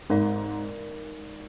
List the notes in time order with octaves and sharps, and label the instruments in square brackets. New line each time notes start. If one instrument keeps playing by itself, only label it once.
[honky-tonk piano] G#2 [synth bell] G#3 D#4 A#4 D5